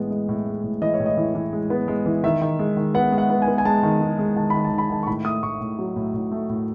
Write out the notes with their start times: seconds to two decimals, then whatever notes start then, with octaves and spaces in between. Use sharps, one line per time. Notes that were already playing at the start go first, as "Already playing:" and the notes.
Already playing: A2 E3 G#3 B3
0.10 G#3
0.29 A2
0.46 G#3
0.64 A2
0.82 E3 D#5
0.94 C#5
1.00 A2
1.06 D#5
1.17 E3
1.35 E3
1.53 G#3
1.70 B3
1.88 G#3
2.06 E3
2.24 D#3 E5
2.42 D#3
2.59 G#3
2.77 D#3
2.94 B3 F#5
3.12 G#3
3.18 F#5
3.30 B3
3.42 G#5
3.48 B3
3.58 G#5
3.65 G#3 A5
3.83 D#3
4.01 G#3
4.19 G#3
4.36 D#3 A5
4.50 D#3 B5
4.64 A5
4.72 D#3
4.78 B5
4.90 D#3 A5
5.03 C#6
5.07 A2 B5
5.25 A3 D#6
5.43 A2 C#6
5.61 A2
5.79 F#3
5.96 A2
6.14 A2
6.31 A3
6.50 A2